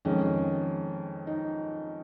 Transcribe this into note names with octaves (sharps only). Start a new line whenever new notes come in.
F2 D#3 G#3 C#4
D#4